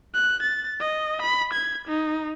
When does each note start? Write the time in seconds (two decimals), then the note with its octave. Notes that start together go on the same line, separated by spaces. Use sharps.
0.14 F#6
0.42 A6
0.80 D#5
1.22 B5
1.53 G#6
1.88 D#4